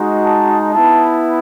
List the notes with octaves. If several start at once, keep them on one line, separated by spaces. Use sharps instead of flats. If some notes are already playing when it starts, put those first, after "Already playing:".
Already playing: G#3 D#4 F#4
A5
B3 E4 A5